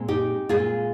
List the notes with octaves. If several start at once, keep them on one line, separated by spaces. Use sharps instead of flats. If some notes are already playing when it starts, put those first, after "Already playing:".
Already playing: A#2 G#3 C4
D#4 G4
A#2 G#3 C4 F4 G#4